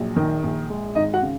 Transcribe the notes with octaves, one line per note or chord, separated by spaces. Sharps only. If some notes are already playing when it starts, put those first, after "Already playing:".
Already playing: A#1 F#3
D#3
A#1
G#3
G#1 D#4 D#5
F#4 F#5
C#3